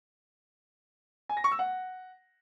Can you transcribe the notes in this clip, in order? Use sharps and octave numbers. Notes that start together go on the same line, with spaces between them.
G#5
A#6
C#6
E6
F#5